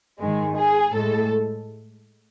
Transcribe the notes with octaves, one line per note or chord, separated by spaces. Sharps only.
G#2 D#3 G#3
G#4
A2 G#3 A4